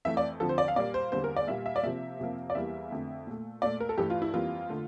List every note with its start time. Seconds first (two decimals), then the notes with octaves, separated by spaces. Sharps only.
0.05 F2 E3 A3 E5
0.17 D5
0.40 F2 D3 F3 A4
0.49 C5
0.58 D5
0.68 F5
0.76 A#2 G3 A#3 D5
0.94 C5
1.12 E2 D3 G3 A#3 C5
1.24 A#4
1.36 D5
1.47 A#2 G3 A#3 E5
1.66 E5
1.76 D5
1.83 C3 F3 A#3 E5
2.19 F2 C3 F3 A#3
2.50 D5
2.55 E2 E3 G3 A#3 E5
2.91 F2 D3 A3
3.27 A#2 A3
3.62 A#2 A3 D5
3.80 A#4
3.89 A4
3.98 G2 E3 A3 G4
4.10 F4
4.22 E4
4.34 F2 E3 G3 A#3 F4
4.70 D3 A3